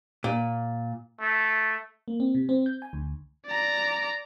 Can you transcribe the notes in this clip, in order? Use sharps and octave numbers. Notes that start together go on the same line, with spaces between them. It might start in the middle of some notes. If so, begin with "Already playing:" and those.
A#2
A3
A#3
C4
C3
C4
G6
G#5
D2
D5 A#5